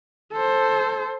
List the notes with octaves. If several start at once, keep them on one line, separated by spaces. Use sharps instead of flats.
A4 C5